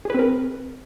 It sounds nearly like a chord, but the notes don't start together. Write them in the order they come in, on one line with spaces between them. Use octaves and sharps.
G#4 B4 C4 A#4